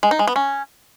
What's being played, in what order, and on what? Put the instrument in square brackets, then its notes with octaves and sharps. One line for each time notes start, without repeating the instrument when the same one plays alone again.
[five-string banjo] G#3
D#4
G#3
B3
C#4